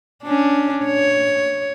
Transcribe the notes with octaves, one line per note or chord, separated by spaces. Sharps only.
C#4 D4
C#5